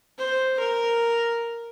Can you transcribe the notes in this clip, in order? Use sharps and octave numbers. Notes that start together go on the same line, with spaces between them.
C5
A#4